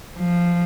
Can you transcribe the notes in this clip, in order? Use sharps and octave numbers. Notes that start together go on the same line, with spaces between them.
F3